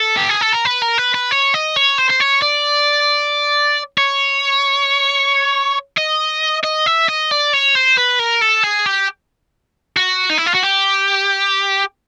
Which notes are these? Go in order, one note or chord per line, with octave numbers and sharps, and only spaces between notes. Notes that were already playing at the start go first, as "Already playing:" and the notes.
Already playing: A4
G4
G#4
A4
A#4
B4
A#4
B4
B4
C#5
D#5
C#5
C5
C5
C#5
D5
C#5
D#5
D#5
E5
D#5
D5
C#5
C5
B4
A#4
A4
G#4
G4
F#4
D#4
E4
F4
F#4
G4